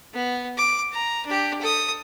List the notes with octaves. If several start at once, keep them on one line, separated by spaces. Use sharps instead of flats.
B3
D6
A#5
D4 G4
A4 D#6